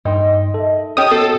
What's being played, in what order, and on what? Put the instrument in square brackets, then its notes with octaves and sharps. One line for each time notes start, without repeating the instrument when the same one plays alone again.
[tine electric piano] G2 G5 C6 [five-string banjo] A#3 D#4 [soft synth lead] D#5
[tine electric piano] A4 E5
[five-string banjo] C#4 G4 A5 [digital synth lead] D#6
[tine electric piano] B3 F#4 C7 [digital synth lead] A4